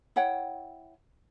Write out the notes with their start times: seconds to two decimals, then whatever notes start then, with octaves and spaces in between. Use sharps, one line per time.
0.16 E4 C#5 F#5 G5